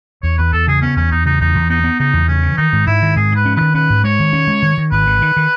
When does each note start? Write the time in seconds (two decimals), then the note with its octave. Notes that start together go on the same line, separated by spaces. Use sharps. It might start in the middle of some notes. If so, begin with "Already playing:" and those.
0.23 E2 C#5
0.38 E2 B4
0.52 E2 A4
0.68 C#3 G#4
0.82 B3 C#4
0.96 E2 C#4
1.11 E2 D#4
1.26 C#3 D#4
1.41 E2 D#4
1.55 E2
1.70 B3 D#4
1.84 B3
1.99 C#3 D#4
2.13 E2
2.28 C#3 C#4
2.43 E3
2.57 D#3 D#4
2.73 G#2
2.87 G#2 E4
3.02 D#3
3.16 G#2 G#4
3.32 G#2 B4
3.45 C#4
3.56 B4
3.61 D#3
3.74 C#4 B4
3.90 G#2
4.04 G#3 C#5
4.19 D#3
4.33 C#4
4.47 G#3
4.62 D#3
4.78 D#3
4.92 G#1 B4
5.07 D#3
5.22 D#3
5.37 D#3